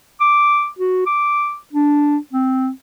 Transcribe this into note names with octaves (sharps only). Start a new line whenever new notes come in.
D6
F#4
D6
D4
C4